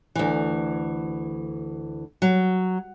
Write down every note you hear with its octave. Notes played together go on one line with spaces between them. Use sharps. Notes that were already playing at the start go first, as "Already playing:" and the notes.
D2 E3
F#3